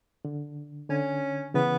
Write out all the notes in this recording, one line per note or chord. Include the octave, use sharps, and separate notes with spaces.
D3
D3 C#4
C#3 E3 B3